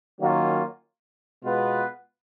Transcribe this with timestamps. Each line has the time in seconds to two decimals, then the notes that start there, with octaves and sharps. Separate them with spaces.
0.20 D#3 F#3 A#3 C#4 F4
1.43 B2 G#3 B3 F4 B4